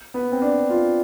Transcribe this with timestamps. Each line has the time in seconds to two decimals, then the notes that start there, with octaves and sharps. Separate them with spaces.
0.14 B3
0.32 C4
0.42 D4
0.70 F4